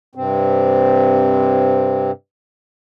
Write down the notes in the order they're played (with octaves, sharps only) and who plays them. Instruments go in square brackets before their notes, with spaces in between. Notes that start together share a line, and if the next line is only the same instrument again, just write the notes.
[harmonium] G2 C3 C4